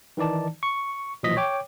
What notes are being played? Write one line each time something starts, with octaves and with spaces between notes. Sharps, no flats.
D#3 E3 D#4 D5 A5
C#6
B1 A#2 E3 F3 D#5 B6
C#5 G5 D6